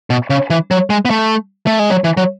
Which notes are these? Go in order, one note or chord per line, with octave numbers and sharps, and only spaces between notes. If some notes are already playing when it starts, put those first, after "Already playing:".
B2
C#3
E3
F#3
G#3
B3
A3
A3
G#3
F#3
E3
F#3